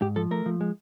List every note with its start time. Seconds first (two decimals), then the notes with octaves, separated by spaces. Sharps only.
0.01 G#2 G4
0.16 F3 A4
0.31 A3 A#4
0.46 F3
0.61 G#3